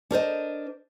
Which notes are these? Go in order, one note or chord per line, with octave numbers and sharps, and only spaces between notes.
D4 A#4 C5 D#5